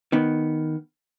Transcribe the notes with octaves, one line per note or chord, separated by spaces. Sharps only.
D#3 B3